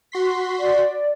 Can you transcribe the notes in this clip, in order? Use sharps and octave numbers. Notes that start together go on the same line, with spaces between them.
F#4 C6 B6
D5